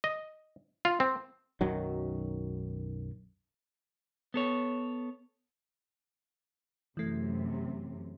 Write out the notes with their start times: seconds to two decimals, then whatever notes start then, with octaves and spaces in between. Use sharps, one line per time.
0.04 D#5
0.85 F4
1.00 C4
1.61 B1 F#2 D#3 F#3
4.34 B3 A4 C#5
6.97 F#2 C3 E3 A3